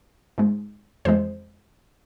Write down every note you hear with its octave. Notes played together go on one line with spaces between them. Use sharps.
G#2 G#3
F2 E3 G#3 C5